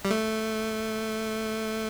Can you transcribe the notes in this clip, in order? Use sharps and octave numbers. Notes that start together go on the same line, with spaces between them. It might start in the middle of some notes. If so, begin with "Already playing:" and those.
G3
A3